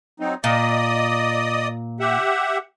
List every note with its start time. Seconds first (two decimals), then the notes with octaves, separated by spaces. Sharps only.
0.20 F#3 C4 D#4
0.44 A#2 D5 D#5 D#6
2.00 G4 E5 F#5